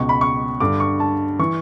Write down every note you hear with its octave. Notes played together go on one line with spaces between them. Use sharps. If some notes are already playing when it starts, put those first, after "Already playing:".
Already playing: C#2 B2 C#6
B5
C#6
G2 D3 D6
C#6
A5
E3 C#6